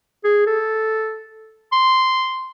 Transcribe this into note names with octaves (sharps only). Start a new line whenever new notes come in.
G#4
A4
C6